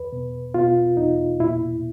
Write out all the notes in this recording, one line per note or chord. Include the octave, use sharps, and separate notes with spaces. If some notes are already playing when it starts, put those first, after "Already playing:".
Already playing: E2 B4
B2
B2 F4
E2 D#4
A#2 E4